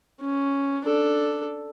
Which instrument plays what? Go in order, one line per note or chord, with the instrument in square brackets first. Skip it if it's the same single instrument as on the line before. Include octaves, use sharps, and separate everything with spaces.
[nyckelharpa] C#4
D4 A4